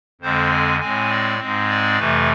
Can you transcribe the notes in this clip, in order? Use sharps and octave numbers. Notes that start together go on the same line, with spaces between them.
F2 D3 G#3 C4 C5
G#5
A2 G#3 C4 G#5
D5
G#2 G#3 C4
D5
F2 C3 E3 A3 B4